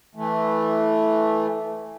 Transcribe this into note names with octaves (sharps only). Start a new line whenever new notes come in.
E3 A3